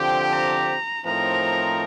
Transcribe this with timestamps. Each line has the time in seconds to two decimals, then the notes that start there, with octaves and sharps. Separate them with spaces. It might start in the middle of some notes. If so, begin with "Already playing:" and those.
Already playing: D3 F3 C4 G4 G5
0.32 A#5
1.05 A2 F3 C4 D#4 A#4 A#5